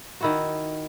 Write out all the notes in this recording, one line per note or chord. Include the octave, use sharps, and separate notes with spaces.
D#3 E4 F#4